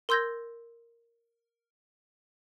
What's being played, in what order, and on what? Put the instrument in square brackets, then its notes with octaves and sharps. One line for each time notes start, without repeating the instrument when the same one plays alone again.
[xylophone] A#4 C6 E6 G6 G#6 A#6